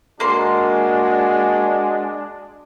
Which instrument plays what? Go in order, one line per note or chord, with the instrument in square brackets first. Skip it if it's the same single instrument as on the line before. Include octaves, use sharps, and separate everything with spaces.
[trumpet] G#3 [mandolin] A#3 C6 [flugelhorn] D4 [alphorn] F#4